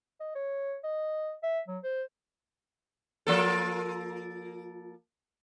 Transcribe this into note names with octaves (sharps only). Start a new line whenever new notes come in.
D#5
C#5
D#5
E5
F#3
C5
F3 A#3 A4